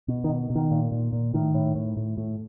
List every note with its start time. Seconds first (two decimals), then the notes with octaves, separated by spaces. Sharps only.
0.08 B2
0.24 D#3
0.29 B2
0.50 B2
0.55 D#3
0.71 A#2
0.92 A#2
1.13 A#2
1.34 A2 D#3
1.54 A2
1.75 A2
1.97 A2
2.17 A2